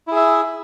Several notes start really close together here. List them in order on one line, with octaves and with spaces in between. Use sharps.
E4 G#4 E5